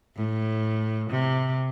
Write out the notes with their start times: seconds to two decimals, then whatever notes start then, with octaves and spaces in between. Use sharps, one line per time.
0.16 A2
1.11 C3